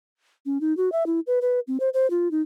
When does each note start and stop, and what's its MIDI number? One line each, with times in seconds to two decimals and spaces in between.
0.46 0.61 61
0.61 0.76 63
0.77 0.92 66
0.92 1.06 76
1.06 1.20 64
1.27 1.39 71
1.42 1.60 71
1.67 1.78 60
1.80 1.89 72
1.94 2.09 72
2.10 2.31 65
2.31 2.42 63